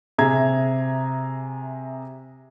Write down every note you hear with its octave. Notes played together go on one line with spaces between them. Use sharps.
C3 G#4 E5 A#5 G#6